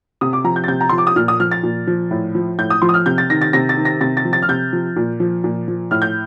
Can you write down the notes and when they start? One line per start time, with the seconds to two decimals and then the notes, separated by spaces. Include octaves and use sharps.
0.21 C3 D#6
0.33 D6
0.44 F3 A#5
0.56 G6
0.64 A6
0.68 C3 G6
0.81 A#5
0.89 F3 C6
0.98 D6
1.07 D#6
1.16 A#2 F6
1.28 D#6
1.40 F3 F6
1.52 A6
1.63 A#2
1.87 F3
2.11 A2
2.35 F3
2.58 A2 G6
2.70 D#6
2.82 F3 C6
2.89 D#6
2.94 F6
3.06 C3 G6
3.18 A6
3.30 D#3 A#6
3.42 A6
3.53 C3 A#6
3.69 A6
3.77 D#3
3.85 A#6
4.01 C3 A6
4.17 A6
4.25 F3
4.33 A6
4.42 F6
4.49 C3 G6
4.73 F3
4.96 A#2
5.20 F3
5.44 A#2
5.68 F3
5.91 A2 F6
6.02 G6